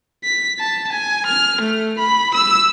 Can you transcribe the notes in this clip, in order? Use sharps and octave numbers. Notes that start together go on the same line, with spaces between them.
B6
A5
G#5
F6
A3
B5
E6